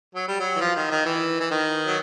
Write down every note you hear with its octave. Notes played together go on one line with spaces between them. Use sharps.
F#3
G3
F#3
E3
F3
D#3
D#3
E3
E3
D#3
F#3